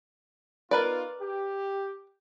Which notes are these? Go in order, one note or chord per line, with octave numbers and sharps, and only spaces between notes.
B3 D#4 F4 A#4 B4 D5
G4